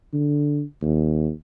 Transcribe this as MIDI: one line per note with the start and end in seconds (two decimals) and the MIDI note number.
0.13 0.62 50
0.82 1.31 39